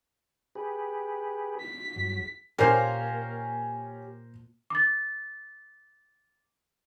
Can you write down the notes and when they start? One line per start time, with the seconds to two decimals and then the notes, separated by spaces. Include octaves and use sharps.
0.55 G4 G#4 B4
1.60 B6
1.96 G2 F#3
2.58 A#2 A#3 C#4 G4 A#4 C5 A#5 C7
4.70 D6 A6